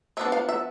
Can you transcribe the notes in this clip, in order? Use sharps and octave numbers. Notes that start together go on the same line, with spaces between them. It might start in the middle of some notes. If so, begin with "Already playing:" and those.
F3 B3 D4 E5
F5
E5